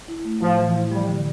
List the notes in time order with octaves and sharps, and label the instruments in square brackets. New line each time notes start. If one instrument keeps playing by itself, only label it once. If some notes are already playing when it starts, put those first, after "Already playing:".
[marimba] E4
A3
[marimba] A2 [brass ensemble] F3
[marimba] E3
E4
[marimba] F3 [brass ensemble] G3
[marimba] D3